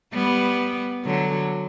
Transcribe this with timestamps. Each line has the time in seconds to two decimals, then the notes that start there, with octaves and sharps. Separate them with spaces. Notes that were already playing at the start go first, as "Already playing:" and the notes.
0.13 G3 B3
1.05 D3 F#3